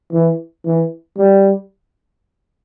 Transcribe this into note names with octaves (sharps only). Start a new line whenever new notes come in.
E3
E3
G3